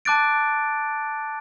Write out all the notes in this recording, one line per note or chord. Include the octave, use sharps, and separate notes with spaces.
A5 D6 F#6 A6 D7